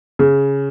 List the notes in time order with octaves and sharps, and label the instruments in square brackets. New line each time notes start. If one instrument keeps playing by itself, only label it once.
[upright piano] C#3